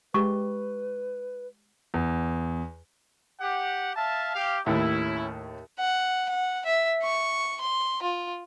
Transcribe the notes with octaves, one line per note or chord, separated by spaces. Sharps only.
G#3 G4 B4 C#6
E2
G4 F#5
E5 F5 A5
G4 F5
D#2 A2 C#4 E4
F#5
F#5
E5
C#6
C6
F4